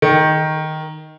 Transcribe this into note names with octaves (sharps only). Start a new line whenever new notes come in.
D#3